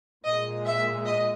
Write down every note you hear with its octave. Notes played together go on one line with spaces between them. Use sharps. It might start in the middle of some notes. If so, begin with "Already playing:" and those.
A#2 G#3 D#5
E5
D#5